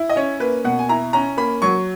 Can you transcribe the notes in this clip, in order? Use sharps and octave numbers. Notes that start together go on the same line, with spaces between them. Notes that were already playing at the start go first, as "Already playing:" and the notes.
Already playing: E4
D#5
C#4 C#5
A#3 B4
B2 F#5
G#5
E4 A#5
C#4 A#5
A#3 B5
F#3 C#6